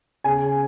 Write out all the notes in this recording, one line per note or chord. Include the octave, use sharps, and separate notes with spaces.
C#3 G#5